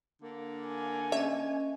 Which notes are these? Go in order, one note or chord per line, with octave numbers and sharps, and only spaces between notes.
D3 A#3
G#5
C#4 D#5 E5